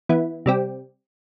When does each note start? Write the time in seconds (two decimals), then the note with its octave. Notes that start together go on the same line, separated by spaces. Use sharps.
0.09 E3 B3 E4
0.46 C3 G3 C4 G4